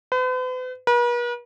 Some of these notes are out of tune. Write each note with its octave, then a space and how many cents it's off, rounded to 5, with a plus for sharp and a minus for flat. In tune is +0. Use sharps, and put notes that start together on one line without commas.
B4 +45
B4 -45